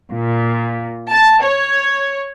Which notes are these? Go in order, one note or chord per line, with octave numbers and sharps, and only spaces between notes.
A#2
A5
C#5